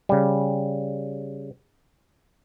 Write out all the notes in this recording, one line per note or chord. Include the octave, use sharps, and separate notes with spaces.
C#3 G3